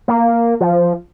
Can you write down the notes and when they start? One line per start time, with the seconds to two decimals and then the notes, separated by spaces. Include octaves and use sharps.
0.08 A#3
0.61 F3